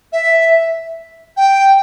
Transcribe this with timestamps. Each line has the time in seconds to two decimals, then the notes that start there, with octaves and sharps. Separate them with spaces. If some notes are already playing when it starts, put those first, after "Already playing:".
0.13 E5
1.37 G5